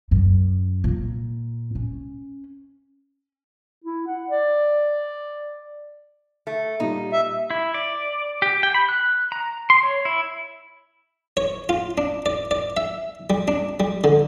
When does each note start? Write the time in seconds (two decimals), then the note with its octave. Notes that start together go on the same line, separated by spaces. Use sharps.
0.11 F#2
0.84 A#2
1.75 C#4
3.84 E4
4.07 F#5
4.30 D5
6.47 A3
6.80 A#2 G3 D#4
7.13 E5
7.50 E4
7.74 D5
8.42 G4
8.63 G5
8.74 B5
8.89 F#6
9.32 A#5
9.70 C6
9.83 C#5
10.05 E4
11.37 C#5
11.69 F4
11.98 D4
12.26 D5
12.51 D5
12.77 E5
13.30 G3
13.48 D4
13.80 G3
14.04 D3